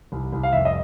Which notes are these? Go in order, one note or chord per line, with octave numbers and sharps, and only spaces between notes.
C2
C2
F5
F1 E5
D#5